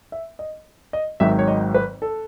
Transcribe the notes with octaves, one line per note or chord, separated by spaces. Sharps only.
E5
D#5
D#5
G#1 G#2 D#3 F#3 E5
C#5
D#5
B4
A4